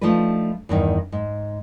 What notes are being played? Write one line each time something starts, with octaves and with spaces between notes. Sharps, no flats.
F3 A3 D4 D#4 B4
E2 G2 D#3
G#2